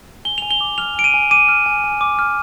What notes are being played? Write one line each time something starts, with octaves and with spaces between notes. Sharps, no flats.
G#5 G7
G#5 F7
G7
D6
F6 F7
G#5 D7
D#7
G#5
D6 D#7
F6
G#5
G#5
D6
F6